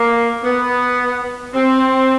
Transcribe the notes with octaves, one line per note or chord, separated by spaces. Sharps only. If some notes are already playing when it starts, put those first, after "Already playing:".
Already playing: A#3
B3
C4